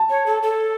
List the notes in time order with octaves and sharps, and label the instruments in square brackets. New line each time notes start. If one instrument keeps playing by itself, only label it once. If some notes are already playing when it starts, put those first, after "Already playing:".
Already playing: [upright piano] A5
[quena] C#5
A4
A4